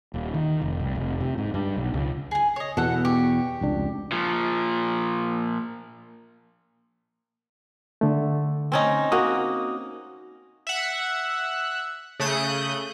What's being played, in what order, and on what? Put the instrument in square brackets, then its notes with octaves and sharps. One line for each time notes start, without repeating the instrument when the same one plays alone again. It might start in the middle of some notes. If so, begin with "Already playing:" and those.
[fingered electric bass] D#1
D#3
F1
C2
F1
C3
G#2
G2
B1
C#2
[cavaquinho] G#4 G#5
C#5 D#5
[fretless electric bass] E2 B2 [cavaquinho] A4 F#5
[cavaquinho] G4 C#6
[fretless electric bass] F1 C#2 D4
[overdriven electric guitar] A#2 F3
[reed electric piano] D3 A3
[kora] C4 C#4 D#4
[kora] A#3 [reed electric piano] F#4 D#6
[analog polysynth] E5 F#5
C#3 A3 D#6 F#6 G6